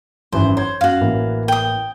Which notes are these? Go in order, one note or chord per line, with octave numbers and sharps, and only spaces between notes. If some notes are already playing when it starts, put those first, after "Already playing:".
G#1 F#2 E3 C5
C5 C#5 C6 G#6
F#2 F#4 F5
A1 E3 A#3
G5 D#6